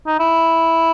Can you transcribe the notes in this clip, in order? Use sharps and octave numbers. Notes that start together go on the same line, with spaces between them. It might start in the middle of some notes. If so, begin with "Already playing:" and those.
D#4
E4